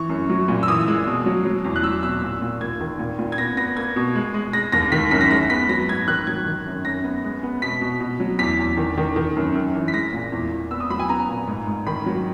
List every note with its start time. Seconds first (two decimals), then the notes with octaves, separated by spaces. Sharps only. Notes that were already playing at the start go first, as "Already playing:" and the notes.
Already playing: E3 C#6
0.09 F#2
0.30 F#3
0.48 A#2
0.63 E6
0.68 E3 D#6
0.88 G#3
1.07 B2
1.26 F#3
1.45 F#3
1.64 E2
1.76 F#6
1.83 F#3 E6
2.03 B2 E6
2.22 A#2
2.42 A#2
2.61 D#2 G#6
2.80 D#3
2.99 A#2
3.19 A#2
3.32 G#6
3.38 B3 A#6
3.57 B3 A#6
3.77 A#3 G#6
3.96 B2
4.15 G#3
4.34 G#3
4.53 G#3 A#6
4.72 D#2 A#6
4.92 D#3 B6
5.11 F#2 B6
5.21 A#6
5.31 G#3 A#6
5.50 B3 B6
5.69 F#3 A#6
5.89 G#2 G#6
6.07 D#3 F#6
6.27 F#3 G#6
6.46 D#3
6.66 F#2
6.85 F#2 A#6
7.04 B3
7.24 G#3
7.43 B3
7.62 B2 B6
7.81 B2
8.01 B2
8.20 F#3
8.39 E2 B6
8.58 E2
8.77 D#3
8.97 D#3
9.16 D#3
9.36 F#2
9.55 F#2
9.75 E3
9.88 B6
9.94 G#3 A#6
10.13 A#2
10.32 E2
10.51 E2
10.71 B3 E6
10.80 D#6
10.90 F#3 B5
10.99 G#5
11.09 B3 A#5
11.29 A#2
11.47 G#2
11.67 G#2
11.87 D#3 B5
12.06 F#3